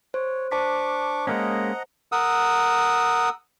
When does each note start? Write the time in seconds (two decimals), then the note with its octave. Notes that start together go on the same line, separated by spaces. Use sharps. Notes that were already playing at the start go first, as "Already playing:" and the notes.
0.14 C5 C#5
0.51 D4 C5 A5 C#6 D6 B6
1.27 G#3 A#3 C#4 D#5 F#5 A#5
2.12 A#4 F#5 D#6 E6